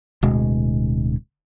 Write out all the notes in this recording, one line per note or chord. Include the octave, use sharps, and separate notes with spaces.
D1 B2 G#3